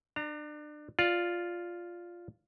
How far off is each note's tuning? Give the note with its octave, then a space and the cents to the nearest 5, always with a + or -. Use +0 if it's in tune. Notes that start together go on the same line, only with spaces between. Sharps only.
D4 +30 A#5 -20
F4 +0 D5 +0